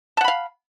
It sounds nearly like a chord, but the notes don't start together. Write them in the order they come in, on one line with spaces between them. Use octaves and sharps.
A5 F#5 B5 F5